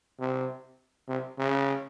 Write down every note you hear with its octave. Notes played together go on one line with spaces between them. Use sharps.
C3
C3
C#3